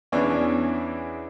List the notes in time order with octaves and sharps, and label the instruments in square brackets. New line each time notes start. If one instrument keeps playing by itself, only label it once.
[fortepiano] E2 E3 B3 C#4 D4